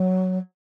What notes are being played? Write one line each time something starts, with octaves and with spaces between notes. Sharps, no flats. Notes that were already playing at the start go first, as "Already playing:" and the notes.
Already playing: F#3